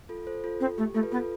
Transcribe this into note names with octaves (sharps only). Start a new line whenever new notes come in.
F4 A4
A4 C5
F4 A4
C4
A3 G4
A3 F4 A4
B4
B3 F4 A4